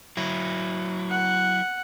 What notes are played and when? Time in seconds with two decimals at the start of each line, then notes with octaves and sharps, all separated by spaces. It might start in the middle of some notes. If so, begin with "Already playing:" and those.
0.17 F#3 E4
1.10 F#5